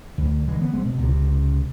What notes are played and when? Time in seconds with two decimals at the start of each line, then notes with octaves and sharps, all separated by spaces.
0.18 D2
0.48 D3 E3 G#3
0.61 B3
0.73 G#3 A3 C4
0.85 B2
0.98 C#2 C3